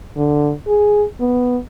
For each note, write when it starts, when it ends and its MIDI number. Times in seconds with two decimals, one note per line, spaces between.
0.17 0.52 50
0.67 1.05 68
1.20 1.57 59